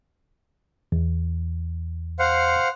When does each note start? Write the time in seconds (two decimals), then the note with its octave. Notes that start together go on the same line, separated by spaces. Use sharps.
0.92 E2
2.19 C5 F5 F#5